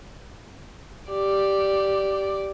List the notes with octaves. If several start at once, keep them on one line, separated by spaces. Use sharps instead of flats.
G4 D5